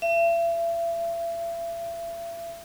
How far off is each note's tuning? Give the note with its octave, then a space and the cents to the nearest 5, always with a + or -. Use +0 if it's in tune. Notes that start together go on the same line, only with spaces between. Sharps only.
E5 +40